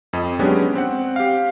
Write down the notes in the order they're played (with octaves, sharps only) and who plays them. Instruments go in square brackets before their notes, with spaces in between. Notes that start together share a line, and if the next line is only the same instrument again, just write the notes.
[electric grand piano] F2 D#5
F#3 G#3 B3 C#4 D4 G4
C4 F#5
G4 F5